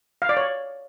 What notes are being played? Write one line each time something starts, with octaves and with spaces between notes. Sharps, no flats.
F5
D5
C#5